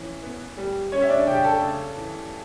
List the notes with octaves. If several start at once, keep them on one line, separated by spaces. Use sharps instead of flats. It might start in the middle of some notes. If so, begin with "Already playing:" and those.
Already playing: E3 C#4
B3
G3
G3 C#4 C#5
E5
D4 D5
C#3 G4 G5
A4 A5
C#3
E3